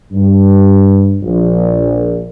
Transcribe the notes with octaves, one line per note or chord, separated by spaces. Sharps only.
G2
A#1